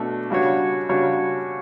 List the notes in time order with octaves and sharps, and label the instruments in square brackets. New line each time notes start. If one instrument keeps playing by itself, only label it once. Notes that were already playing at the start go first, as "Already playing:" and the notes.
Already playing: [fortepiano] B2 A3 D4 F#4 A4
C#3 G3 D4 F#4 C#5
C#3 G3 D4 F#4 C#5